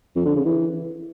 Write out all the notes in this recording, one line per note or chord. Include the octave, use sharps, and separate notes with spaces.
F2
D3
C#3
E3